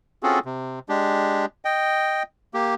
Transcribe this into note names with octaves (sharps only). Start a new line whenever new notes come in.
C4 C#4 F4 F#4 G#4 A4
C3
G#3 D4 G4
D#5 G5
A#3 G4